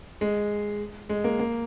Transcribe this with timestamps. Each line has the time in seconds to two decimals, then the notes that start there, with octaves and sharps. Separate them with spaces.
0.21 G#3
1.09 G#3
1.24 A#3
1.39 A#3